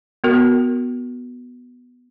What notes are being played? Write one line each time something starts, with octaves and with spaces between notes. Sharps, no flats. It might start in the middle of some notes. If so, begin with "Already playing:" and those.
B3 F#4 A#4